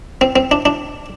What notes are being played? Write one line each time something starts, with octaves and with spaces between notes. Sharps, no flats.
C4
C4
D4
D4